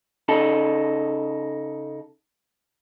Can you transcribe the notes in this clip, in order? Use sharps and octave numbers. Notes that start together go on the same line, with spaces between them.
C#3 D#4 A4